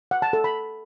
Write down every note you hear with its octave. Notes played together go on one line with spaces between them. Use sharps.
F#5
A5
A4
B5